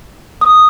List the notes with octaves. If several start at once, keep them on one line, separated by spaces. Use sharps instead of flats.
D#6